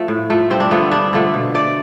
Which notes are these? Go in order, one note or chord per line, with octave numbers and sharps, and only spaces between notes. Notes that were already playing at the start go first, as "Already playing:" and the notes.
Already playing: F3 A3
A2
F3 A3
G2 C4
D4
D3 F3 A3 B3
G2 D4
D3 F3 A3
B2
A3 D5